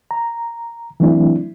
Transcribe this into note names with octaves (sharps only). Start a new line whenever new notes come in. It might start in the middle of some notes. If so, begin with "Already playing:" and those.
A#5
E3 F#3 A3 C4 D4 E4